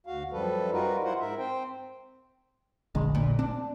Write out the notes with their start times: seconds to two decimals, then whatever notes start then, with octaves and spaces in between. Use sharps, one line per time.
0.07 D2 F#4 F5
0.32 F#2 F3 G3 A4 B4
0.72 G3 D#4 F4 F#4 A#4 B4
1.04 E4 F4 A#4 C5 F#5
1.20 G#2 A#4 E5
1.38 C4 C5 G5
2.95 E1 A#1 D3 G#3
3.15 A#2
3.39 C4 D4